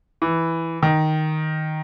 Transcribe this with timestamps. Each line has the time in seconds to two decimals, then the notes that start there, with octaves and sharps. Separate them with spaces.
0.22 E3
0.83 D#3